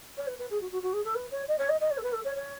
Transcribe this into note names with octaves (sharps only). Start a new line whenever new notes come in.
C#5
B4
B4
G#4
F#4
F#4
F#4
G#4
A4
B4
C#5
D#5
C#5
D#5
D#5
C#5
A4
B4
A4
C#5
C#5